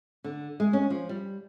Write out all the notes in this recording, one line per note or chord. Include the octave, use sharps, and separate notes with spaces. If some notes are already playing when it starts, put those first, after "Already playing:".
D3
G#3
C#4
F3
G3